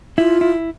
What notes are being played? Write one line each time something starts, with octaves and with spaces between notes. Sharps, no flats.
E4 F4
E4